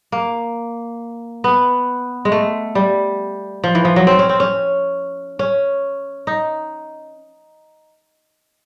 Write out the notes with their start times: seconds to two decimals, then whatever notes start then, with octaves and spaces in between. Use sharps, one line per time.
0.12 A#3
1.44 B3
2.25 G#3
2.32 A3
2.75 G3
3.64 F3
3.75 E3
3.85 F3
3.96 F#3
4.07 C4
4.19 C#4
4.29 C4
4.40 C#4
5.39 C#4
6.27 D#4